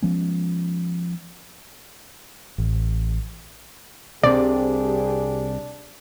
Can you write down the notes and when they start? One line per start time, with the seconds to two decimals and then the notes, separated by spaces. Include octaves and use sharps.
0.03 F3 G#3 B3 C#4
2.58 A1
4.23 C2 G2 C3 D4 G4 G#4 D5